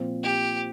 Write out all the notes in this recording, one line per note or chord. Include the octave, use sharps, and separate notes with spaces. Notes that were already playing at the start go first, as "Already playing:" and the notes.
Already playing: A#2 F3 C4 F4
G4